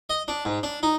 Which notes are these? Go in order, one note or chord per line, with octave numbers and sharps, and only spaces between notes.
D#5
D4
G#2
D4
D#4